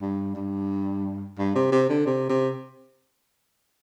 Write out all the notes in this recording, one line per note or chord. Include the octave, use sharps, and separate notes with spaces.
G2
G2
G2
C3
C3
D3
C3
C3